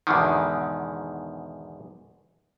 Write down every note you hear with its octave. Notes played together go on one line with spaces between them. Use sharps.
E2 G#2 B2 D3 D#3